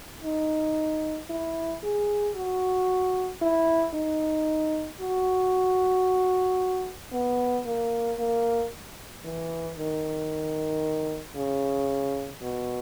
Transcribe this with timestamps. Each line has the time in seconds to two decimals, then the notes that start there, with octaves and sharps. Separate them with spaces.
0.24 D#4
1.30 E4
1.83 G#4
2.36 F#4
3.42 E4
3.95 D#4
5.01 F#4
7.12 B3
7.66 A#3
8.19 A#3
9.25 E3
9.77 D#3
11.36 C#3
12.42 B2